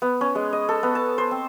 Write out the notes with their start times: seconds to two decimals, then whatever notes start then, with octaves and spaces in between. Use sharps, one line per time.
0.02 B3
0.21 C#4
0.35 G#3
0.53 D#5
0.69 A4
0.83 B3
0.95 A5
1.18 C5
1.31 C4